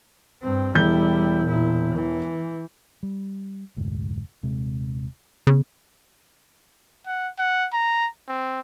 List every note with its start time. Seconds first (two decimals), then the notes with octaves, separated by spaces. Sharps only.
0.43 G2 C4
0.75 E1 G3 E4 G6
1.45 A#2 E4
1.94 E3
3.03 G3
3.77 F1 D2 G#2
4.43 D#1 C3 G#3
5.47 C#3 B3
7.06 F#5
7.39 F#5
7.73 A#5
8.28 C4